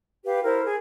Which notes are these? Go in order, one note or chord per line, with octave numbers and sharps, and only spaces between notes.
G4 B4 F5
E4 A#4 C5
G#4